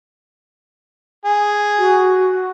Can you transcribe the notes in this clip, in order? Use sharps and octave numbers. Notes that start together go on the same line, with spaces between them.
G#4
F#4